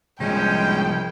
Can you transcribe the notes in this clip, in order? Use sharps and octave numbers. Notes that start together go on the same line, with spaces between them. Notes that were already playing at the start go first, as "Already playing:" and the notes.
C2 D3 D#3 F3 G#3 C#4 G5